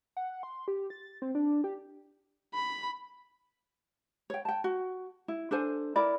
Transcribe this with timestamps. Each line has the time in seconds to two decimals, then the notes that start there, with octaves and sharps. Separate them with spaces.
0.17 F#5
0.43 C6
0.68 G4
0.90 A6
1.22 C4
1.35 D4
1.64 G4
2.54 B5
4.30 C#5 G5
4.45 G5 A5
4.64 F#4
5.28 E4
5.51 D4 A4 C5 G#5
5.96 E4 A#4 D5 B5